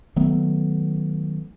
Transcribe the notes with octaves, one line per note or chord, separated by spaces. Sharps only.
D#3 F#3 A3 B3